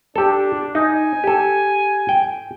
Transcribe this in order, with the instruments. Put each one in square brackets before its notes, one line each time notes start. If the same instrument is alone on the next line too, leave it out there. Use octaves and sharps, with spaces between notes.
[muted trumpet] D4 [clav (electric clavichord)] G4 A4
[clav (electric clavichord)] D#4 [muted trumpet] G#5
[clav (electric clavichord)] G4 A4
G5